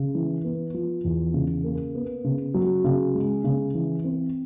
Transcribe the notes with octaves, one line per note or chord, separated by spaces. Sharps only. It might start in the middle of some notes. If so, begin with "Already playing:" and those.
Already playing: C#3
E3
B3
F3
E2
C#3
A#3
B3
C#3
F#3
C#3
G#3
C#3
E3
C4